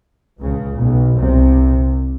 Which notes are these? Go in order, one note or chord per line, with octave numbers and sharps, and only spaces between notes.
C#2 C#3
B1 B2
C2 C3